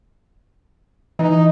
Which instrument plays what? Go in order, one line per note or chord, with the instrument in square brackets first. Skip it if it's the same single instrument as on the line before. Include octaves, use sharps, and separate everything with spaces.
[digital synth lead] E3 [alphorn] D#4